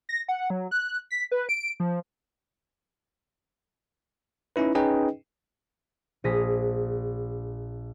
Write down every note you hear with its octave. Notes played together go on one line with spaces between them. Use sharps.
A#6
F#5
F#3
F#6
B6
B4
D7
F3
C#4 D#4 E4 B4
C#4 D#4 G#4 B4 D#5 G5
A#1 G#4 D#6 A#6 B6